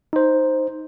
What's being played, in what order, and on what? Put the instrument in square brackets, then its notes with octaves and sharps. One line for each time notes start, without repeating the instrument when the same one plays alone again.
[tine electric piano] D#4 C5